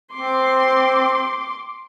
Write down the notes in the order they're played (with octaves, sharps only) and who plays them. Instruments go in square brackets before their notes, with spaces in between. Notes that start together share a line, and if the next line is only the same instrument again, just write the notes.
[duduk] C4 [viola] C6 D6